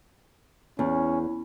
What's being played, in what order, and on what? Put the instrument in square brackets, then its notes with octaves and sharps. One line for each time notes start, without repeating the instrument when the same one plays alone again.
[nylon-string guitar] E2 [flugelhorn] C#4